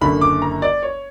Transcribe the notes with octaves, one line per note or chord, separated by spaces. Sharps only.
F#1 F#2 D3 B5
D6
A#5
D5
C#5